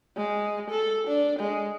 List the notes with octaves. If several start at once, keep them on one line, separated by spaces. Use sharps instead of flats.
G#3
A4
D4
G#3